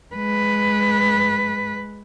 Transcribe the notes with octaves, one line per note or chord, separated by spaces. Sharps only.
G#3 B4